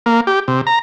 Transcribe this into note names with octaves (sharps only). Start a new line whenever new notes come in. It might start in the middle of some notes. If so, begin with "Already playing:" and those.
A#3
G4
C3
A#5